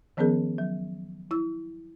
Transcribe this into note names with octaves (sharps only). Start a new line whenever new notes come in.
D#3 F3 B3 C#4 G#4 A#4
F#3
E4 E6